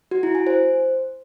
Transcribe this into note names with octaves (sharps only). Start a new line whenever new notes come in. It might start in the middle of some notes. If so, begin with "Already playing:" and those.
F#4
E4
G#5
C5